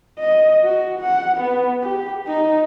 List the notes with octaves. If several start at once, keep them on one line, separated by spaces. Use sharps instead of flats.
D#5
F#4
F#5
B3
G4
D#4